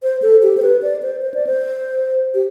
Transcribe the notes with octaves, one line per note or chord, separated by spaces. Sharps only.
C5
A4
G4
C5
B4
D5
C5
C5
D5
C5
G4